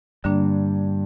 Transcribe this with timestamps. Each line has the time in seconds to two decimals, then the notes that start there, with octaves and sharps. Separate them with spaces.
0.24 G2 D3 G3 A#3 D4